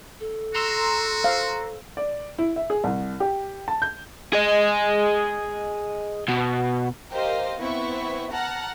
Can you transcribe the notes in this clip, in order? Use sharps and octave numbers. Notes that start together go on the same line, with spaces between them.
A4
F#4 A#5 C6 E6
C5 F5
D5
E4
E5
G#4
C2
G4
A5
G6
G#4 D#5
B2
G4 A#4 C5 D#5 F5
B3 C4 E4 E5 C#6
F#5 A5 A#5 F6